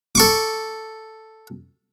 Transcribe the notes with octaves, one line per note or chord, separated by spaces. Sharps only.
A4 C#6 D6